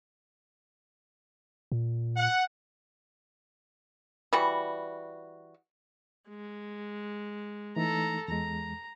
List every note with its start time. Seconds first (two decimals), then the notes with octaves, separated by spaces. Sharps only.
1.72 A#2
2.17 F#5
4.33 E3 G3 F#4
6.29 G#3
7.76 E3 A3 D#4 A4 A#5
8.28 E2 G#3 A#5